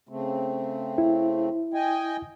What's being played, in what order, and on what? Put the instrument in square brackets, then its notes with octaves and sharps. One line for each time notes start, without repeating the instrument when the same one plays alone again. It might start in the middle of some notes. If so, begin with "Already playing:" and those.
[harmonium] C#3 A3 C4
[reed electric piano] E4
[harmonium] D#5 G5 G#5